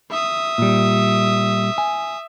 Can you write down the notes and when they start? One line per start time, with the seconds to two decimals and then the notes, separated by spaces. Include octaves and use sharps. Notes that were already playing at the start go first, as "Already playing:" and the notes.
0.10 E5 D#6
0.58 A#2 G3
1.78 G#5